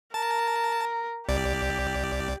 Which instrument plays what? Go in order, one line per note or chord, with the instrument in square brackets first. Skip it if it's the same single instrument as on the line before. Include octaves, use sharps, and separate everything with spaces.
[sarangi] A#4 [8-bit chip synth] A5
[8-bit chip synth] C2 D5 [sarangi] G4